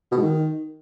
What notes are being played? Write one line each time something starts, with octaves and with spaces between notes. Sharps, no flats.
B2
G#2
D#3